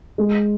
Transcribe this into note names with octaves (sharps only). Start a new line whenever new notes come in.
G#3